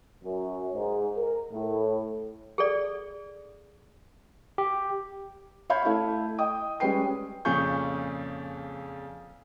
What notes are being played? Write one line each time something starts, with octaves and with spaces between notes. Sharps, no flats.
F#2
G#2
A#4
A2
G#4 A4 D5
G4
C#5 E5 F5 B5 G6
A3 E4 E5 F5
D#5 G5 D#6
G3 G#3 C#4 B4 G5 C7
F2 A#2 C#3 G#4 C#6 G6